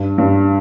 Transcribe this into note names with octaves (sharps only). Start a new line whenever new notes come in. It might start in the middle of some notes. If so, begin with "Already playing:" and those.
Already playing: G2
G2